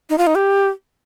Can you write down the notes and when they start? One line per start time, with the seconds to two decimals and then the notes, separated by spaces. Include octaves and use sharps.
0.09 D#4
0.18 F4
0.27 D#4
0.36 G4